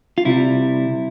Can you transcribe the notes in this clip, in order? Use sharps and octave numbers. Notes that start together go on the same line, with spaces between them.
F4
C2 C3 G3 E4